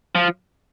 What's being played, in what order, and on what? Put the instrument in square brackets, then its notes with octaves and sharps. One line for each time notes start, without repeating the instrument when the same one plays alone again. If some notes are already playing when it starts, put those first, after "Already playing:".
[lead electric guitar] F3